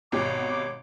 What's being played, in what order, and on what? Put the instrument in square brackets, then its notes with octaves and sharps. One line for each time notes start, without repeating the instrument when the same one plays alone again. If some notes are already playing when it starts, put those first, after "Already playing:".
[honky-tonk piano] G#1 B2 G4 [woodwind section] C#5 D6